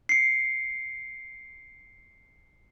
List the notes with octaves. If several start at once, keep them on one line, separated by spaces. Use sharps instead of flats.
C7 C#7